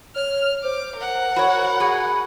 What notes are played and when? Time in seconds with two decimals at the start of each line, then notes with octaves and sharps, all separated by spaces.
0.16 C#5 F6
0.64 C5 D6
0.97 A#4 F#5
1.36 F#4 C#5 B5
1.80 F#4 G#4 B5